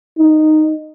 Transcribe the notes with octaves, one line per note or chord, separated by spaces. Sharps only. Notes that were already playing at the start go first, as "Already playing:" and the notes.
D#4